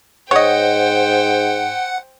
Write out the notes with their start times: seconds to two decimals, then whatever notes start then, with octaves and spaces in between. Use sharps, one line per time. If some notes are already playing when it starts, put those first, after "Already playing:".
0.31 G#2 C5 C#5 D#5 F#5 G5